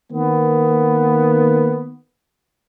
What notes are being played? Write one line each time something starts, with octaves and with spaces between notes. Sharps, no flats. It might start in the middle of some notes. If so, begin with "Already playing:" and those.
D#3 A#3 B3